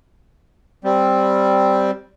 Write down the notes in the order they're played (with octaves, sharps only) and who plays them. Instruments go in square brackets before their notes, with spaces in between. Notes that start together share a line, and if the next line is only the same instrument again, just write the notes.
[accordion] G3 C4